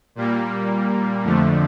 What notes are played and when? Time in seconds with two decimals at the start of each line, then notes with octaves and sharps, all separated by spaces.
0.15 A#2 G3 A#3
1.24 F2 D3 F3 A3